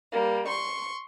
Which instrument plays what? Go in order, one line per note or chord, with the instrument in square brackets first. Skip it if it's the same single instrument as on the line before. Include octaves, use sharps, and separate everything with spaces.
[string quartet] G3 A#3
C6 C#6